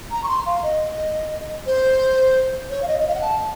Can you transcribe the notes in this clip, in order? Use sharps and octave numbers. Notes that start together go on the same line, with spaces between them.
A#5
C#6
C6
F5
D#5
C5
C#5
F5
D#5
D#5
F5
F#5
A5